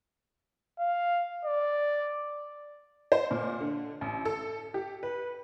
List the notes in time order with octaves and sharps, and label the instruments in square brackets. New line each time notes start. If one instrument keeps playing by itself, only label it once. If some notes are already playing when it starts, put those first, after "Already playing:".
[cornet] F5
D5
[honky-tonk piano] C5
A#2
D3
A1
A4
G4
B4